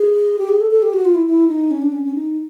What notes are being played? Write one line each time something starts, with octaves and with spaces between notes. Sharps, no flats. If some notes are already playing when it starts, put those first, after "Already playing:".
Already playing: G#4
G4
G#4
A4
A4
G4
F#4
F4
E4
E4
D#4
C#4
D4
C#4
C#4
D#4